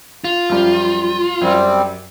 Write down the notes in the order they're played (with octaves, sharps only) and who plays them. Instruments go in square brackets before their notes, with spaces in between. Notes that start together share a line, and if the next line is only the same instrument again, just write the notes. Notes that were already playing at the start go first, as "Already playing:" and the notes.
[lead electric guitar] F4
[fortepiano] F#2 F3 G3
[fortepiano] F#2 [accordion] G3 C4